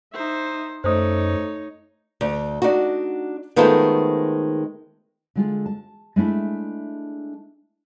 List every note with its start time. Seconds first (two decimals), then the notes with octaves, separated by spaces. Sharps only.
0.13 D#4 C5 E5
0.84 F#2 A3 D#4 C5 C#5 D#6
2.21 D2
2.62 D4 D#4 F#4
3.56 D#3 G#3 A3 B3 F4 C5
5.35 D3 G#3 F4
5.66 A5
6.16 G#3 A3 D4 E4